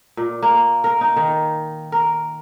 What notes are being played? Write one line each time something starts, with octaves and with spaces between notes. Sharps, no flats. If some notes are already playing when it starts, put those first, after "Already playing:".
A#2
A#3
A#4
D#4
D#3
A#4